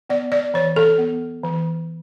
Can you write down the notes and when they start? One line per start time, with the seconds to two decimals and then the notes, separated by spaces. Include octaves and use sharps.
0.10 B3 D5
0.32 D5
0.54 E3 C#5
0.76 A4
0.98 B3
1.43 E3